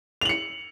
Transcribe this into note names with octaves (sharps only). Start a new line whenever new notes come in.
C#7 F7 F#7